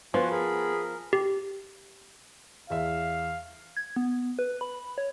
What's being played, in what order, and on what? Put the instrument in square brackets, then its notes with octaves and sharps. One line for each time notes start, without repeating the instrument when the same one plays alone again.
[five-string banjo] F3 [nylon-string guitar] B3 [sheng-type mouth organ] F#4 F#5 G#5
[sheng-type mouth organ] G#4 A#4 B5
A#4
[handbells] G4
[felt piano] E2 E5 [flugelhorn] F5
[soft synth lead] G#6
B3
B4
B5
C#5